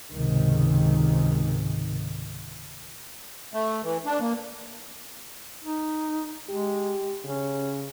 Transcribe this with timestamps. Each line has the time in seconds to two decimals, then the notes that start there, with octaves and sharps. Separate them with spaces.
0.13 C#2 G#2 C3 D#3
3.54 A3
3.84 E3
4.05 D4
4.21 A#3
5.64 D#4
6.49 G#3 G4
7.25 C#3 C#4